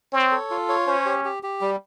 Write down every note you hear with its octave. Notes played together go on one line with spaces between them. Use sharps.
C4 C#5
A4
F4
C#5
C#4 C5
G4
G4
G4
G3